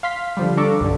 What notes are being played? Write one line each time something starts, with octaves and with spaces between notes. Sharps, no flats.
F5 C6 B6
D3 F3 G3
D4 A4 A#5 C#6 D6
B1 G2 D3